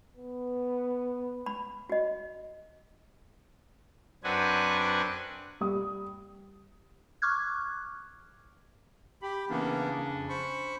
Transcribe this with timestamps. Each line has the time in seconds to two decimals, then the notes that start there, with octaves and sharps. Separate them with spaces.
0.17 B3
1.46 B5
1.89 F#4 D#5
4.24 F#2 C4 D4 B4 F#5 G#5
5.61 G3 D#6
7.22 C#6 D6 F6 F#6 G#6
9.22 G4 B5
9.50 C#3 E3 A#3 B3 C#4 D4
10.12 F2
10.29 C5 B5 C#6